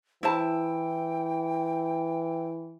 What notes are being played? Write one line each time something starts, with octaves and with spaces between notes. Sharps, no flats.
E3 E4 C5 G5 A5